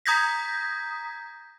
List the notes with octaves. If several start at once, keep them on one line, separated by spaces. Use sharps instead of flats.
A#5 D#6 G6 G#6 A#6 B6